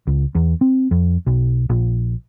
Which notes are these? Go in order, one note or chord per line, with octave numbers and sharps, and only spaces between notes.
C#2
E2
C4
F2
B1
A#1